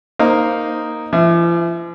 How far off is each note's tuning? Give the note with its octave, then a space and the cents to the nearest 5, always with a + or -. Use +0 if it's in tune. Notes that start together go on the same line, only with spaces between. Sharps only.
A#3 +0 D#4 +0 C5 +0
F3 -45 E5 +0